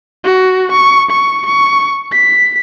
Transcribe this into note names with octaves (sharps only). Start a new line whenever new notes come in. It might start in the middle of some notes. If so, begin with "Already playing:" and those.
F#4
C#6
C#6
C#6
B6